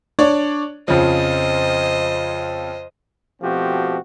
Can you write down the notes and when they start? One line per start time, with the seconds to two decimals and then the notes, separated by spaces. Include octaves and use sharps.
0.19 D4 C#5 D5
0.88 F2 C#3 F3 C5 D#5
3.42 B2 F3 A3 C4 F#4 G4